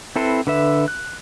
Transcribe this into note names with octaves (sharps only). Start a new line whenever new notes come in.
C4 E4 A4 B4 C5
D3 B4 E5
F#6